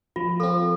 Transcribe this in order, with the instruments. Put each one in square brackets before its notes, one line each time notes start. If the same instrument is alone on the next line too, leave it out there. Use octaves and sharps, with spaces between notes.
[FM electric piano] F3 [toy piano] F4
[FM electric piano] C4 F4 [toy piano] A4